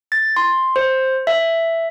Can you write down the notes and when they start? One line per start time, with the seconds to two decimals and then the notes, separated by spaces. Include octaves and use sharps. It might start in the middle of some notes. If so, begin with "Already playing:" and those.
0.12 A6
0.36 C6
0.76 C5
1.27 E5